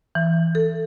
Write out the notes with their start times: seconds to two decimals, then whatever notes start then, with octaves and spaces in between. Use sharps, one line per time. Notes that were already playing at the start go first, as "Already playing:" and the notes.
0.15 E3
0.55 A4